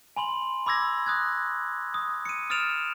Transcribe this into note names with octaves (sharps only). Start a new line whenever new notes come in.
G#5 B5 C6 F#7
B5 D6 E6 G#6 A#6
D#6 F#6 G#6
D#6
C#7 D#7
D#6 F6 A6 D7 E7 F7